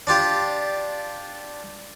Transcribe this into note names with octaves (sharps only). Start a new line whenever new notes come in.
D4 F4 G4